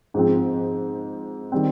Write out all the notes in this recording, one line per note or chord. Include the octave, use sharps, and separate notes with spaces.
G#2 F3 C4
D#3 G3 C4